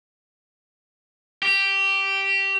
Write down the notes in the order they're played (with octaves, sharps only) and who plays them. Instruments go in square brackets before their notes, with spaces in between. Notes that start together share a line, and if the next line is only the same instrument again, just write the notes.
[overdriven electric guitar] G4